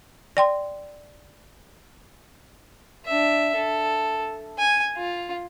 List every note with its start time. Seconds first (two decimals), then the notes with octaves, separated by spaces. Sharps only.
0.37 D5 G5 C6
3.05 D4 E5
3.55 A4
4.58 G#5
4.97 F4